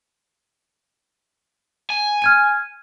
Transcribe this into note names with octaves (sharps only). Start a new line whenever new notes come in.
G#5
F6 G#6 D#7